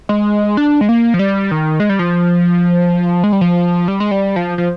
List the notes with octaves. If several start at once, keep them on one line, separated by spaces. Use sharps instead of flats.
G#3
D4
G#3
A#3
F3
G3
D#3
G#3
G3
F3
G#3
G3
F3
G3
G#3
G3
F3
F3